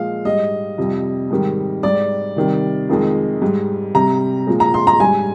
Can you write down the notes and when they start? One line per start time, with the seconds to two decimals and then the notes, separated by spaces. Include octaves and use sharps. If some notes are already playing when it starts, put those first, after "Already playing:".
Already playing: A#2 F3 G#3 F5
0.25 G#2 G3 D#5
0.78 F2 C3 G3
1.31 G#2 D#3 G3
1.83 G#2 G3 D5
2.36 C3 D#3 G3
2.89 F2 D#3 G#3
3.42 G#2 G3
3.94 C3 G3 A#5
4.47 A#2 F3 G#3
4.60 A#5
4.74 C6
4.87 A#5
5.00 G#2 G3 G#5